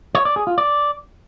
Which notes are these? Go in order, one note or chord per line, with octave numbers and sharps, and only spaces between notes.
C#5
D5
G#4
F4
D5